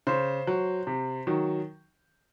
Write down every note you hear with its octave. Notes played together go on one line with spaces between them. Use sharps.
C#3 C5
F#3
C3
D#3 F#3